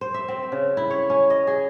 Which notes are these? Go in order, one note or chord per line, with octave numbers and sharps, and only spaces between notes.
C5
E5
C4
C#3
E4
C#5
C#4
D#5
G#4